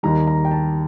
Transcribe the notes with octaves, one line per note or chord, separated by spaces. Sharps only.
D#2 D#3 G3 A#5
A#5
G5
A5